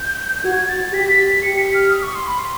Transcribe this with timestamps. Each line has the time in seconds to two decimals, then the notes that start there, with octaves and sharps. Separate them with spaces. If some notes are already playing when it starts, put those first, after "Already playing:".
Already playing: G6
0.44 F#4 G#6
0.69 A6
0.93 G4 B6
1.09 B6
1.42 G4 C#7
1.58 B6
1.74 F6
1.91 D#6
2.03 C#6
2.15 C6
2.27 B5
2.39 C6